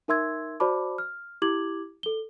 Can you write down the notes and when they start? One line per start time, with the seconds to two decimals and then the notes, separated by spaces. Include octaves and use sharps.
0.08 D#4 A#4 E5 C6 E6 G#6
0.60 F#4 C5 D5 A5 B5 D6
0.98 F6
1.42 E4 G4 D6 G#6 F#7
2.03 A4 G7